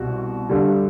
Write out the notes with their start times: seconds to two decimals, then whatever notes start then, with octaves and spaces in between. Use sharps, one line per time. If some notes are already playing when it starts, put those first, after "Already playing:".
Already playing: C2 B2 G3 F#4
0.49 G2 D3 G3